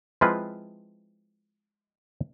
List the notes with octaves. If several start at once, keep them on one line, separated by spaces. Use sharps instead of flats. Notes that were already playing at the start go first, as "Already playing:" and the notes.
F3 G#3 C4 E4 F4 B4